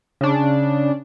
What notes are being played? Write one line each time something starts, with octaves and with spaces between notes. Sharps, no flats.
C#3 D4